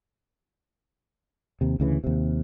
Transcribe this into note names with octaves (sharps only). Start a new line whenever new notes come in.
D#2 C3
D2 C#3 E3
D#2 C3